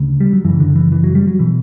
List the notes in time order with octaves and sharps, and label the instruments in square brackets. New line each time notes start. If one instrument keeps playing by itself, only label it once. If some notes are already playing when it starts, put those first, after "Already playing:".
Already playing: [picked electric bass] D2 C#3
G3
F#3
F#2 C#3 E3
D3
E3
E3
F#3
G3
F#3
B2 E3